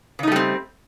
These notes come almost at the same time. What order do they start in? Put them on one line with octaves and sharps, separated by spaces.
C#3 D#4 A3 G3 C4